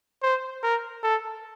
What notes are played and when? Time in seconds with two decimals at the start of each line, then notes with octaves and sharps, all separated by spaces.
0.23 C5
0.63 A#4
1.03 A4